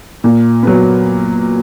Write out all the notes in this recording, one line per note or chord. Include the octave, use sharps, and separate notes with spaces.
A#2
F#3 B3